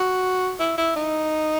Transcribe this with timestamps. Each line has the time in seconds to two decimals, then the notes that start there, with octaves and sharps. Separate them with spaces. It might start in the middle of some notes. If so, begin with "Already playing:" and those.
Already playing: F#4
0.60 E4
0.78 E4
0.96 D#4